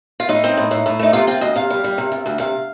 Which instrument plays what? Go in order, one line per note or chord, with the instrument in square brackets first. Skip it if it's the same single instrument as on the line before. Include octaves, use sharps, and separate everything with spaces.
[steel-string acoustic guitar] F4
A2 D#4
C4
A2
A2
A2
A3 D#4
C3 F4
C4 F4
D2 D#5
C3 F5
G3
G3
C3
C3
D2
C3 F5